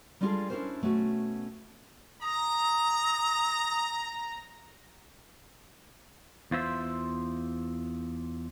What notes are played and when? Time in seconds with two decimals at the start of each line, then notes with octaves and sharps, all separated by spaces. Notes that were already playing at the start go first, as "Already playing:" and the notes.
0.21 G3 G#3 D4 F4 G#4 A4
0.50 C#4 D4 E4 F#4 A#4 C5
0.82 B2 A3 C#4 F#4
2.22 A#5 D#6
6.51 E2 F4 C5 E5